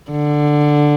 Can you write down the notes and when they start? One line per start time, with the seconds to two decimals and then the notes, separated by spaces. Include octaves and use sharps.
0.11 D3